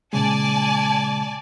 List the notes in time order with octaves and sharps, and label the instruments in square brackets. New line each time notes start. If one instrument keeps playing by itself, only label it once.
[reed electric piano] A#2 C#3 G#3 [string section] D5 G#5 A5